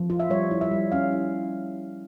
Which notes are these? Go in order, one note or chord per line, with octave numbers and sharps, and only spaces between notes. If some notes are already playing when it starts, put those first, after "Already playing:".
Already playing: F3
F4
E5
G3 C#5
E4
E5
G3
C#4 F5
E4